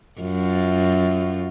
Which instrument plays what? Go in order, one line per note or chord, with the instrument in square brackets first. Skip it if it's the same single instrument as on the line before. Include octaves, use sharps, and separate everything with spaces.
[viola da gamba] F#2 F4